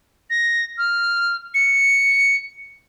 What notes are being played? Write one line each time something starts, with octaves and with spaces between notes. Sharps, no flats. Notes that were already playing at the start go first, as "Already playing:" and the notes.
A#6
F6
C#7